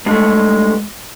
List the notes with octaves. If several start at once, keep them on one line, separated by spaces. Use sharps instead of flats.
G2 G#3 A3